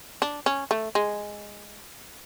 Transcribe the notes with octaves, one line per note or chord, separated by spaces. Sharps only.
D4
C#4
A3
G#3